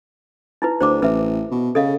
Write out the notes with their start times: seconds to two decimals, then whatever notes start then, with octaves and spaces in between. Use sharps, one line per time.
0.62 D#4 E4 B4
0.81 D2 C5 D6
1.02 A1 B4 E5
1.51 B2
1.75 C#3 A4 D#5 F5